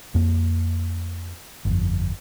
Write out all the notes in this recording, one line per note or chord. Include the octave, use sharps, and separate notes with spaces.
F2 A#3
G1 F2